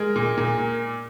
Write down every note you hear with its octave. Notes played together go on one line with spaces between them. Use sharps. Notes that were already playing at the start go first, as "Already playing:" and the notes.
Already playing: G#3 A#4
A#2
A#2